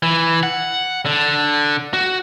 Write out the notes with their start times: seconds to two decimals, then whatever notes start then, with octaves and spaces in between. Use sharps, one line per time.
0.03 E3
0.43 F#5
1.06 D3
1.94 F#4